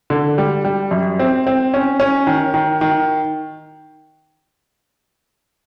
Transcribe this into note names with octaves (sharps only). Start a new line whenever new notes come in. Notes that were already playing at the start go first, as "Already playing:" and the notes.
D3
G3
G3
F#2
C4
C4
C#4
C#4
D#3
D#3
D#3